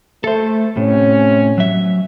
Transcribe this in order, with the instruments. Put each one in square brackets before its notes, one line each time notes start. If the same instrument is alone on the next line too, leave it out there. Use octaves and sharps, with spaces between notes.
[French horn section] A3 [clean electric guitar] A4 C5
[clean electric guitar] A2 [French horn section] C3 C#4
[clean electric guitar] F#3 E5